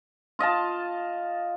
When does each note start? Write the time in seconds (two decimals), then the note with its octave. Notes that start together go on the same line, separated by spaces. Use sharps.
0.39 F4 D#5 F5 A5